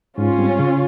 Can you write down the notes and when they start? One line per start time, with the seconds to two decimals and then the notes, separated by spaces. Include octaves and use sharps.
0.18 G#2 C#4 F4
0.38 G3 C4
0.59 C#3